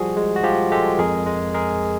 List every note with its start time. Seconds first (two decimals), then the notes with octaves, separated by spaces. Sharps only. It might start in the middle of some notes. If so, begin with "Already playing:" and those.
Already playing: F3 G3 F#4 G#4
0.17 G#3
0.36 F#4
0.43 F3 F4 G4
0.72 G#3 G4 A4
0.99 F2 G#4 A#4
1.26 G#3
1.54 G#3 G#4 A#4